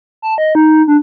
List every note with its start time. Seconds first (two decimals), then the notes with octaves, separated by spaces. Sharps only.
0.22 A5
0.38 D#5
0.55 D#4
0.88 D4